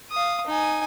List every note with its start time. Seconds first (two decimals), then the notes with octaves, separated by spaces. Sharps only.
0.11 F5 D#6
0.47 D#4 G#5